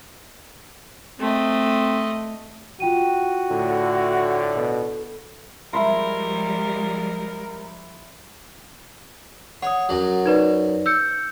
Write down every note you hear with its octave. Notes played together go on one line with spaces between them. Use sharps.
A3 C4 D#5
F4 F#4 G5 D#7
A2 D3
B2 A4
F3 G3 G#3 A#4 E5 B5 C6
C#5 F#5 D#6
F#2 F#3
D#4 B4 D5
E6 G6 C#7